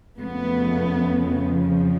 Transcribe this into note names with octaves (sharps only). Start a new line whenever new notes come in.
F2 C#3 F3 A3 B3